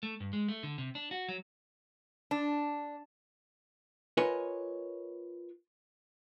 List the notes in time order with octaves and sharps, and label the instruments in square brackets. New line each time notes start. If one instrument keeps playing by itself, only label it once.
[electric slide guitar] A3
G2
G#3
A3
D3
C3
D4
F#4
F#3
[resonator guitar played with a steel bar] D4
[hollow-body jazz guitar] F4 A#4 B4 C#5 D#5 G#5